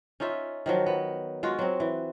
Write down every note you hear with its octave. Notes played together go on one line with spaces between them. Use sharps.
C#4 D#4 F4 E5
D#3 F3 F#3
B3
G#3 F4 F#4
F#3 C4
E3